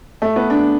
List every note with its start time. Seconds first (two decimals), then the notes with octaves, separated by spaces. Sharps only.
0.22 A3
0.36 B3
0.50 D4